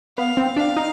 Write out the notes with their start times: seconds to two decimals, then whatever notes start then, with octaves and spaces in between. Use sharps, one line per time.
0.18 B3 F5
0.37 C4
0.56 D4 F5
0.76 D#4